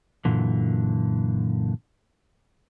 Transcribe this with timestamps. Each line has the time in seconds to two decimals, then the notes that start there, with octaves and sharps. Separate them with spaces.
0.25 F#2 A#2 D3 E3